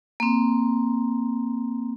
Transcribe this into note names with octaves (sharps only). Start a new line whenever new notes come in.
A#3 C4